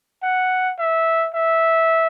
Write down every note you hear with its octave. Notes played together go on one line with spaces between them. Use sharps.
F#5
E5
E5